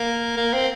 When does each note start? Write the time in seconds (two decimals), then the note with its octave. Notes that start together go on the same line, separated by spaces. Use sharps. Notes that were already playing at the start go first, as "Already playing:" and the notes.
Already playing: A#3
0.37 A#3
0.53 C4